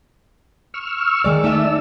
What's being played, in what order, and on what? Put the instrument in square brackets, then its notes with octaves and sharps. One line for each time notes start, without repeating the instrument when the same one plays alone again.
[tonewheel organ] C#6 E6 F6
[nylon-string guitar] D#3 G#3 D5
[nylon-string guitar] A3 A4 E5 [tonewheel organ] D#4 D5 E6